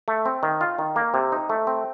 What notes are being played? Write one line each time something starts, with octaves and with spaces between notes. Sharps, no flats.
A3
C4
D#3
F4
D#3
A#3
C3
D#4
A3
C4